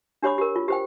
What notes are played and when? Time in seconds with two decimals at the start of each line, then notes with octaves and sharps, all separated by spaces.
0.23 D4 G4 C#5 B5 D6
0.38 G4 A#4
0.56 F4
0.68 G4 C5 G5